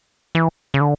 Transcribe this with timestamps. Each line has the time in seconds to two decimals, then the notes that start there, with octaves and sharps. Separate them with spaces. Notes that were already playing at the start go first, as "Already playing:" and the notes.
0.35 E3
0.74 C#3
0.81 D3